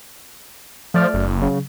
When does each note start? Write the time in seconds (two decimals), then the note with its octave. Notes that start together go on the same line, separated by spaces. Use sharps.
0.94 F3 A3 D5 F6
1.14 F#1
1.41 C#3 F#3